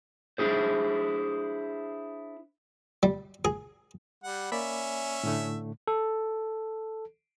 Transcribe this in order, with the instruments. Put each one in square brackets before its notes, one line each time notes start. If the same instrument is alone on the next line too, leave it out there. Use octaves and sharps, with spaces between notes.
[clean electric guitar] D4 E4 G#4 C5
[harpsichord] G3
G#4
[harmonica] G3 F#5
[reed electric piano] A#3 D5 B5 [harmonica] C#4 E5
[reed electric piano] A2 D3 A3
[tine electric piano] A4